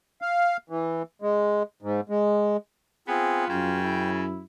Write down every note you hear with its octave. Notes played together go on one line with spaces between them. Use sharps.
F5
E3
G#3
G#2
G#3
B3 C4 F4 G#4
F#2 C#3 G5
E4